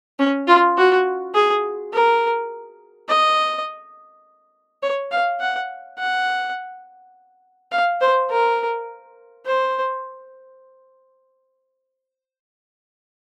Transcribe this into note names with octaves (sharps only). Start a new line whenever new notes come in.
C#4
F4
F#4
G#4
A#4
D#5
C#5
F5
F#5
F#5
F5
C5
A#4
C5